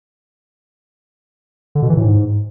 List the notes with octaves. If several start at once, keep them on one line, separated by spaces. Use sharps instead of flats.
D3
B2
E3
A2
G#2